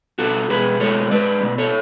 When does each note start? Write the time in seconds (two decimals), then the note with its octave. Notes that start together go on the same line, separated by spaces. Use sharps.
0.19 B2 F#4 A4
0.50 B2 G#4 B4
0.80 G#3 A4 C#5
1.11 G#3 B4 D5
1.43 B2
1.58 A4 C#5